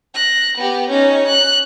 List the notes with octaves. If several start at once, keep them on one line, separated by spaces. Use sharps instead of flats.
F#6 A#6
B3 G4
C#4 D#4
F#6